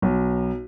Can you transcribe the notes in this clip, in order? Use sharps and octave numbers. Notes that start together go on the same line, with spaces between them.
B1